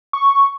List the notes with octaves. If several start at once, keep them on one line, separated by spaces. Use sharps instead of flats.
C#6